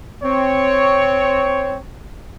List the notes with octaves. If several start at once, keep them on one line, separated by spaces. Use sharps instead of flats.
C4 C#5